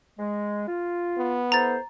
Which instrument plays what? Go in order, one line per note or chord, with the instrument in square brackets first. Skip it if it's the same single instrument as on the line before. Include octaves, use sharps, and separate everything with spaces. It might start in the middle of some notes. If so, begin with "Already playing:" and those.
[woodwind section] G#3
F4
[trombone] B3
[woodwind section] E4 A4 C5 [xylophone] A#5 A6